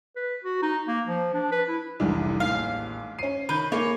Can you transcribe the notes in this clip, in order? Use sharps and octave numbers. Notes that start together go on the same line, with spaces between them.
B4
F#4
D#4
A#3
F3
D4
B4
E4
F1 C2 G#2 E3 D4
A1 D#2 F5
C#4 C7 D#7
D#3 B4 G6
A#3 G#4 C#5